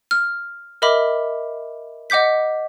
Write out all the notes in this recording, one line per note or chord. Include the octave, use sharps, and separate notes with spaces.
F6
A#4 D#5 E5 B5 D6
D#5 F#5 D6 G6 B6